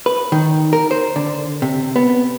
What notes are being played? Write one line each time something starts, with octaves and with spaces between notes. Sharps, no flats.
B4
D#3
A#4
C5
D3
C3
B3